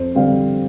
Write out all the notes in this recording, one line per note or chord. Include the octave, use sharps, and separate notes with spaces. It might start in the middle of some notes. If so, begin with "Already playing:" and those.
Already playing: F2 C5
D3 G3 C4 F5